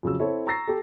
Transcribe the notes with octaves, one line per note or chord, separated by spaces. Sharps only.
F2 C#3 F#3 E6
C4 E4 A4 C#5
A#5 C#6 E6 A6 A#6 C7
G4 A4